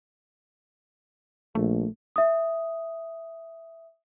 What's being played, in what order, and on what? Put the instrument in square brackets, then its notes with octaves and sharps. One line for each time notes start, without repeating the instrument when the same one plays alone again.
[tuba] A#1 [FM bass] A3
[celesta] E5 D#6